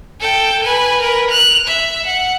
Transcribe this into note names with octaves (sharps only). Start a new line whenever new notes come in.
A4 G5
B4 G#5
A#4 B4
F#6 F7
E5
F#5